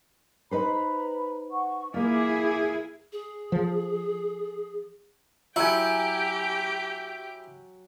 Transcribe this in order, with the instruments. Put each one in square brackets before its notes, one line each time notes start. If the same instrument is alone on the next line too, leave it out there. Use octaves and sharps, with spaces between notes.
[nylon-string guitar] D#4 B4 C5 [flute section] A#5 B5
[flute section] F#5 C#6
[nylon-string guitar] A#3 F4 [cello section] E4 G#4 [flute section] D6
[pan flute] G#4
[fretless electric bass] F3
[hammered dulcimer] F#3 G#5 [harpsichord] E4 [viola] G4 G5